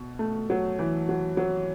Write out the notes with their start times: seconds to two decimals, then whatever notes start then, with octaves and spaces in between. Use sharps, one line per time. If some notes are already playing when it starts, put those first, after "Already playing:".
Already playing: B2
0.19 A3
0.50 F#3
0.79 E3
1.09 F#3
1.37 F#3